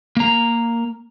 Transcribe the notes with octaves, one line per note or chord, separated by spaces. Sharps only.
A#3 A#5